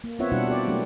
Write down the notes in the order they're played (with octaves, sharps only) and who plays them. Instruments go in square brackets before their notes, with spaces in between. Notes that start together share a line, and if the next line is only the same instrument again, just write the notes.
[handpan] A#3
B3 C4 F4 C#5 E5 F#5
B2 G3 D4 E4 F#4 F#5
G4 D5
F#3 A3 A#3 D4 G4